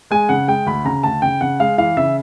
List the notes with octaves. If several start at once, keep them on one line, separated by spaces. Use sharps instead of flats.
G#3 G#5
C#3 F#5
G#3 G5
D2 B5
C#3 A#5
D2 A5
C#3 G5
C#3 F#5
G#3 F5
E3 F5
C#3 E5